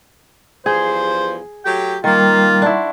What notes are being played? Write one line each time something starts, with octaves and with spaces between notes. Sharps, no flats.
E2 G2 F3 G#4 C5
F#3 A3 G4 G5
D#3 G3 A#3 F4 A#4
D4 E4 F#5 C6 C#6